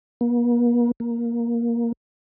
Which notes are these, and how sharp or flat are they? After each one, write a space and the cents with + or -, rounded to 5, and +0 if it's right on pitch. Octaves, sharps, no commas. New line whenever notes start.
A#3 +45
A#3 +10